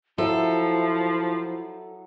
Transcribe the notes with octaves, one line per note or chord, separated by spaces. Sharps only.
F3 F#3 E4 A4 E5